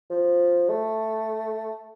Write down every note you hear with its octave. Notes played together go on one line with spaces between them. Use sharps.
F3
A3